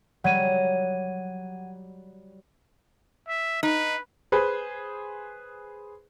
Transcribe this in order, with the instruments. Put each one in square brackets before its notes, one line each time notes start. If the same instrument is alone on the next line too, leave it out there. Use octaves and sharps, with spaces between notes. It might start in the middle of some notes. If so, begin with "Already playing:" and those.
[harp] F#3 G3 [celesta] F#5 G#6 D#7
[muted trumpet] E5
[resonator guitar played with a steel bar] D#4 [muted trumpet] B4
[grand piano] G#4 B4 C5